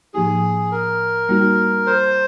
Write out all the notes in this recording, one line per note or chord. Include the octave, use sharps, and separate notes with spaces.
A2 F3 A#3 D#4 G4 G#4
A#4
G3 A#3 D#4 F#4
C5